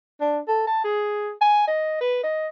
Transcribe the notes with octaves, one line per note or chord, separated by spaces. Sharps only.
D4
A4
A5
G#4
G#5
D#5
B4
D#5